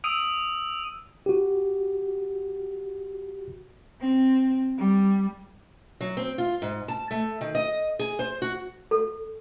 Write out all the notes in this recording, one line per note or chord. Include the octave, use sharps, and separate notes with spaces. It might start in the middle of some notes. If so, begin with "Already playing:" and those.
D#6 E6 D7 D#7
F#4 G4
C4
G3
F#3
C4
F4
G#2
A5
A3
D#3
D#5
G#4
C5
F#4
A4